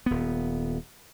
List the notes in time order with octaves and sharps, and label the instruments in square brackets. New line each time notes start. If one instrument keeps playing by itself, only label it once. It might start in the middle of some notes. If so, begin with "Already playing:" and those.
[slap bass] D#1 B3